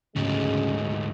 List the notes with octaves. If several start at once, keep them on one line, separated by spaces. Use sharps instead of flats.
A1 D2 G#2 C#3 F#3 G#3